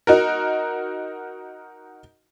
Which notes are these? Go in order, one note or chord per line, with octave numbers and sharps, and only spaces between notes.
D#4 F#4 A#4